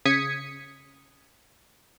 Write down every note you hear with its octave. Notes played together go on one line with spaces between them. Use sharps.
C#3 D#6 G#6 B6 C#7